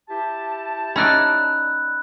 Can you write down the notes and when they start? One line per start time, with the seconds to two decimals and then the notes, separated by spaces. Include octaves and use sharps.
0.09 E4 G4 A5
0.96 C#4 D#4 D5 B5 E6 F#6